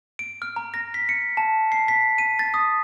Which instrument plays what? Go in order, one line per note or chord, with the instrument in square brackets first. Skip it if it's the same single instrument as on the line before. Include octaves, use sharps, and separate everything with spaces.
[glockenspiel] D7
F6
A#5
A#6
B6
C#7
A5
C7
B6
D#7
A6
D#6